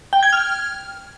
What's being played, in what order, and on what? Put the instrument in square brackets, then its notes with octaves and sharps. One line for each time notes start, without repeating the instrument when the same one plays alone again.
[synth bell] G5
G#6
F6